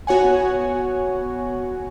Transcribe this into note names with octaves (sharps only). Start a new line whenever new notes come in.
B3 F#4 C#5 F#5 G#5